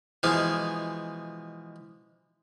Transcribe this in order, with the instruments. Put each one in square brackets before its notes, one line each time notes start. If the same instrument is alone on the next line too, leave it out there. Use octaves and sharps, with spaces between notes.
[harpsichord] B2 E3 F3 G#3 F5 G#5